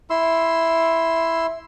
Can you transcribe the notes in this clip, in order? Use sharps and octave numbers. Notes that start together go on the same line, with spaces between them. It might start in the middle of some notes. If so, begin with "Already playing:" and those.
E4 C6 E6